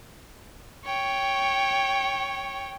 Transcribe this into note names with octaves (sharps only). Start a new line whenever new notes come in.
C#5 G5